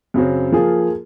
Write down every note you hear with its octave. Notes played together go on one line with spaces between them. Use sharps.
F#2 C#3 F#3 C4
F3 A#3 F4 G#4